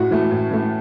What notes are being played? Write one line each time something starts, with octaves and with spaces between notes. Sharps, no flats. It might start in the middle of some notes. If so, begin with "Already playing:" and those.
Already playing: A2 F#4
E3 A3
A2
E3 A3